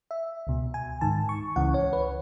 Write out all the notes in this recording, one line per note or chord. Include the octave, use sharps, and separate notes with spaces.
E5
C#2 B2
G#5
G#2 D#3 A5
C#6
C#2 C#3 E3 F#5
C#5
B4